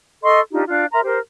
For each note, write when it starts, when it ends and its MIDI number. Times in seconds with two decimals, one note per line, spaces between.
0.24 0.40 69
0.24 0.40 75
0.24 0.40 84
0.24 0.40 85
0.51 0.64 62
0.51 0.64 63
0.51 0.64 65
0.51 0.64 67
0.68 0.85 62
0.68 0.85 65
0.68 0.85 77
0.68 0.85 90
0.92 1.02 70
0.92 1.02 76
0.92 1.02 82
0.92 1.02 84
1.03 1.18 67
1.03 1.18 70
1.03 1.18 72